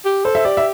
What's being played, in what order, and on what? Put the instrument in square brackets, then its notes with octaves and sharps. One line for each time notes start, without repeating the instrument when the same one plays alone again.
[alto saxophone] G4
[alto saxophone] A4 [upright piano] C5
[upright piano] E5
[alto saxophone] G4 [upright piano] D5
[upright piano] E5